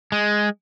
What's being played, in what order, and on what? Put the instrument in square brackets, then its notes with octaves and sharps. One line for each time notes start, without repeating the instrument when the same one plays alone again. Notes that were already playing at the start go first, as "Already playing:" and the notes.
[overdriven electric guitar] G#3